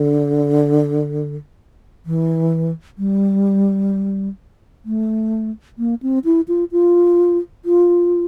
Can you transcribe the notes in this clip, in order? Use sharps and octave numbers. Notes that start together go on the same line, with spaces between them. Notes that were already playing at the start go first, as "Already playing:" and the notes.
Already playing: D3
E3
G3
A3
A#3
C4
E4
F4
F4
F4